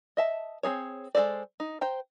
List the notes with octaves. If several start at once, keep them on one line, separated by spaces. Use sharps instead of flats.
D#5 E5 A5
C4 C#4 G#4 C#5
G#3 F#4 A4 C5 D5
D#4
C5 G5 A#5